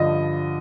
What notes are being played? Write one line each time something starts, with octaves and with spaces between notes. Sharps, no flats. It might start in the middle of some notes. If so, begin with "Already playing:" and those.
Already playing: G2 D3 F3 D#5